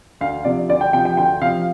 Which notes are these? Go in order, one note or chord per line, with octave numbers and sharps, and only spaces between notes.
D2 F5
C3 F3 D5
D2 D5
G5
C3 F3 G5
G5
D2 G5
C3 F3 F5